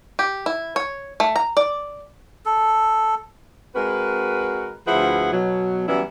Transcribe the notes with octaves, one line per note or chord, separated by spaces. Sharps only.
G4
E4
C#5
A3
A#5
D5
A4
G#3 C4 F#4 A#4 B4
D2 F3 E4 G#4 B4 F#5
B2 F#3
E3 F#3 G3 B3 C#4 E4